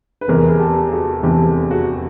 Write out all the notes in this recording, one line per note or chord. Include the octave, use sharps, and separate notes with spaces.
B4
F1 E2 C3 G#4 A#4
G#4
G4 A4
F#4 G#4
F1 E2 C3 G4 A4
F#4 G#4